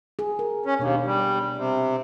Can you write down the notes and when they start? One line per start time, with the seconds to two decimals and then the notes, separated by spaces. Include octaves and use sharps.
0.19 G#4
0.39 A#4
0.66 C#4
0.79 D#2 B2 D4
1.06 G3
1.57 C3